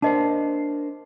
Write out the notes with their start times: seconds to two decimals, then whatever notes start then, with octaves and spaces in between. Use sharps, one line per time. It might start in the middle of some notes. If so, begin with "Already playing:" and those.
0.02 D4 A#4 C5 D#5 A5